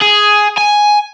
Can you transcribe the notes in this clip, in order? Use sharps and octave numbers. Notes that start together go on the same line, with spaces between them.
G#4
G#5